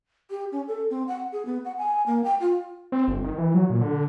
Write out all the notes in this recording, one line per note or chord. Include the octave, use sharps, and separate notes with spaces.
G4
C#4
A4
C4
F#5
G#4
B3
F#5
G#5
A#3
G5
F4
C4
G1
D#3
E3
F#3
A#2
D3